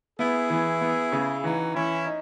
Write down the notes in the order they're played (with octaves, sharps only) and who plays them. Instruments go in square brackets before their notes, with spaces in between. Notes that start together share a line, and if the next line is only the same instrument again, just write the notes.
[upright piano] B3 [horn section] E4 G#4
[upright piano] E3
B3
C#3
[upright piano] E3 [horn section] D#4 F#4
[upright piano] E3 [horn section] C#4 E4
[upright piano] D#4